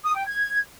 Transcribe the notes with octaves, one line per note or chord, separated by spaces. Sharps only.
D#6
G5
G#6